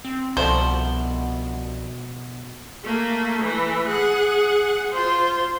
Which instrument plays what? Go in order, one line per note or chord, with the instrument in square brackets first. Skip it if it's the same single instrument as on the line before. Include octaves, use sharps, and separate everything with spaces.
[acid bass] C4
[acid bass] C2 [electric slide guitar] B2 F#4 A5 [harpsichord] D3 F3 E4 [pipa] C5
[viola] A3 A#3
E3 A3
G#4 F#5
F4 C5